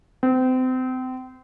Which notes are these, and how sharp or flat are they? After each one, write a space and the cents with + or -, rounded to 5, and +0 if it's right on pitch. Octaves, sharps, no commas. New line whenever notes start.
C4 -30